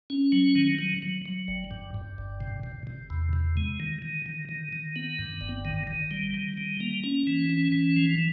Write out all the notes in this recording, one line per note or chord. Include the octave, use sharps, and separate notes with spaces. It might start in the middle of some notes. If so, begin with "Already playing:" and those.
C#4
F#3
D#3
F#3
F#3
F#3
G1
G2
G2
G1
C3
C3
C3
E2
C3
G#3
D#3
D#3
D#3
D#3
D#3
B3
G2
G1
D#3
D#3
G3
D#3
G3
A#3
C#4
E3
C#4
E3
F3